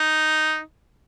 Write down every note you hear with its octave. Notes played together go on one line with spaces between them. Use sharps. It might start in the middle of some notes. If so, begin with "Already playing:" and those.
Already playing: D#4